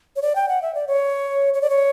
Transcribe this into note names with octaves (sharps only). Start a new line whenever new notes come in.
C#5
D5
G5
F#5
E5
D5
C#5
C#5
D5
C#5